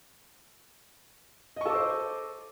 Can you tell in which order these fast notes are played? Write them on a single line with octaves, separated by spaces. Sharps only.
D#5 C#6 A4 D6 C5